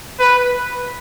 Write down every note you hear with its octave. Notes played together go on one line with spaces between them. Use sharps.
B4